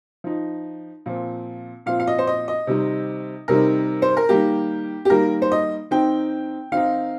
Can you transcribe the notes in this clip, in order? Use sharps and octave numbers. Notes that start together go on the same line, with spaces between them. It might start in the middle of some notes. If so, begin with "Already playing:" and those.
F3 D#4
A#2 F3 C4
A#2 F3 C4 F5
F5
D#5
C5
D#5
D#5
C3 D#3 G3 C4 D#4
C3 D#3 G3 C4 D#4 A#4
C5
A#4
D#3 G3 A#3 G4
G4
D#3 G3 A#3 A#4
C5
D#5
D#3 C4 D#4 G5
D#3 C4 D#4 F5